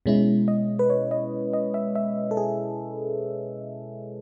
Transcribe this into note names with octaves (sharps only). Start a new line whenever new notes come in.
B2 G#3 C#4 E4
D#5
B4
C#5
D#5
D#5
E5
E5
A4
G#4